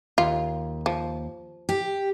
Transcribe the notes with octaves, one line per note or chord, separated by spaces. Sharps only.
D#2 F4
F3
G4